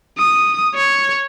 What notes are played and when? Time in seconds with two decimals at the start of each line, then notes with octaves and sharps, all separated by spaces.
0.19 D#6
0.75 C#5